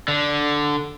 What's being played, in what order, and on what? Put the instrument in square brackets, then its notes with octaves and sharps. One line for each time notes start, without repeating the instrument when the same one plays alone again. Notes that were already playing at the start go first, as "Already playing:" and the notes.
[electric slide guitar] D3